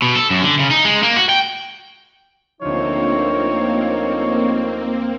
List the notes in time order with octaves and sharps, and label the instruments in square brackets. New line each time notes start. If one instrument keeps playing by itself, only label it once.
[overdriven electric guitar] B2
A4
F#2
D3
C#3
D#4
G#3
A#3
F#4
G5
[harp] D2 F4 [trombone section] D3 F3 D#4 [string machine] A#3 C4 [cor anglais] C#5